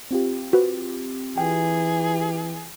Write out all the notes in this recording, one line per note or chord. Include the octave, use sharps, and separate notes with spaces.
C4 F4 G4
F#4 B4 C5
E3 G#4 G5